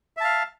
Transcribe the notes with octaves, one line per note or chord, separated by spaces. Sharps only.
E5 F5 A5